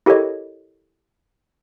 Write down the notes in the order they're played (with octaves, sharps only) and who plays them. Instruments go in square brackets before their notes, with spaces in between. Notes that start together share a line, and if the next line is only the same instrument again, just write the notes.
[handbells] E4 G4 A4 A#4 C#5 D#5